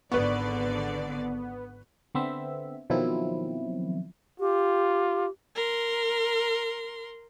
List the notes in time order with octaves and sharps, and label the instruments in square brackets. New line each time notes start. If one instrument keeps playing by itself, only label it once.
[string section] G#1 D3 D5 [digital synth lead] B3 [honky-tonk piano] B4 C#6
[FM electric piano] D3 B3 C4 E5
B2 D#3 F3 F#3 C4 E4
[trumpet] F4 [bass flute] G4
[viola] A#4 C6